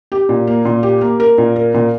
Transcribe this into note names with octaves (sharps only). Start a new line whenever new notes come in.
G4
A#2
A#3
A#2
G4
A#3
A#4
A#2
A#4
A#2